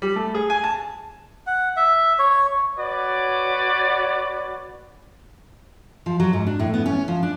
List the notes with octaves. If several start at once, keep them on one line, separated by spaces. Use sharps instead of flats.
G3
A3
G#4
G#5
A5
F#5
E5
C#5
F#4 B4 C#5 D5
F3
F#3
G#2
D4
A2
B3
C#4
F3
D4